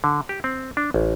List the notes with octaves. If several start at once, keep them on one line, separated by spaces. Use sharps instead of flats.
D3
G4
C4
D4
A1